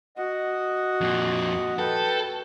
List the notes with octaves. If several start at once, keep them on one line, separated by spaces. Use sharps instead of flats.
F#4 D#5 F#5
F2 A#2
A4 B4 G5